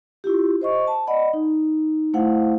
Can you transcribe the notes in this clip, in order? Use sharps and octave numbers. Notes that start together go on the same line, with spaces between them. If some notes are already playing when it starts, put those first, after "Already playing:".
E4 F4 G4
C5 D#5 C#6
A5
D5 D#5 F#5 B5
D#4
A3 E4 C5 F5 F#5